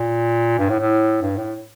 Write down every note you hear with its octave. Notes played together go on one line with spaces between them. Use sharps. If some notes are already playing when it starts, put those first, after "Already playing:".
Already playing: A#2
G2
A2
A2
G2
A2